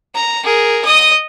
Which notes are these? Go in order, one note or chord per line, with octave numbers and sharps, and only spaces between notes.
A#5
G#4 A#4
D#5 D#6